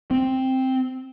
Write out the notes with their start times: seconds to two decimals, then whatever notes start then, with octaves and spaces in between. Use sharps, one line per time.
0.11 C4